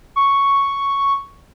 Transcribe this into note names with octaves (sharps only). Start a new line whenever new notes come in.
C#6